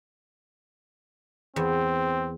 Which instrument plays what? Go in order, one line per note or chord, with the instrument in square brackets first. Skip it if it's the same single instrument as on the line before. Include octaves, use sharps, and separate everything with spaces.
[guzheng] E2 [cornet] C4